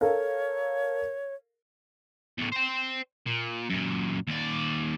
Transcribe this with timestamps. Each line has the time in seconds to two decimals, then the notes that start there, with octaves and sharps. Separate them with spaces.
0.01 A4 A#4 C#5 F5
2.38 E2 A2
2.52 C5 G5
3.27 A#2
3.70 F#2 A#2
4.28 D#2 D5